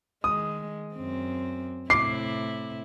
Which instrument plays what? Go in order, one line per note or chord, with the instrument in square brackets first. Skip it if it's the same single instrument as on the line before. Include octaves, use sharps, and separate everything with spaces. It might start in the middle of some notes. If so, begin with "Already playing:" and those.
[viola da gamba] D#3 G#3 [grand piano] D#6
[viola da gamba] F#2 C4
[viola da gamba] A2 C3 E4 [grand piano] D6 C7